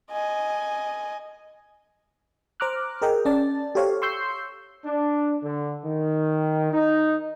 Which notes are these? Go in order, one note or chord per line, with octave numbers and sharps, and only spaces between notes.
D#5 G#5
C5 A#5 D6 F6 F#6
G#4 A#4 D#5 G5
C#4 D5 A5 A6
G4 A4 C5 C#5 F5
C6 C#6 E6 G6 C7
D4
D3
D#3
D#4